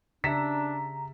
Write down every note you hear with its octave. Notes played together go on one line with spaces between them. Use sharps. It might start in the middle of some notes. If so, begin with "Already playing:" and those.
C#3 D4 G4 E5 A#5 B6 E7